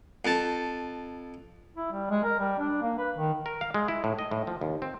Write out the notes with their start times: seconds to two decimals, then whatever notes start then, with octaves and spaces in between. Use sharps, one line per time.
0.25 F2 A5
1.76 E4
1.92 G3
2.10 G#3
2.24 A#4
2.39 G3
2.59 D4
2.82 A#3
2.98 B4
3.17 D#3
3.46 A#4
3.61 F5
3.74 G#3
3.88 E4
4.04 A2
4.19 D#5
4.31 A2
4.47 F3
4.61 D#2
4.82 C4